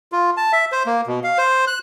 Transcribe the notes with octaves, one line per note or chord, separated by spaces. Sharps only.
F4
A5
E5
C5
A#3
B2
F5
C5
F#6